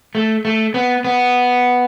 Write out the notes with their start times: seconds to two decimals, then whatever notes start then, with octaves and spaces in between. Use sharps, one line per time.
0.15 A3
0.45 A3
0.74 B3
1.05 B3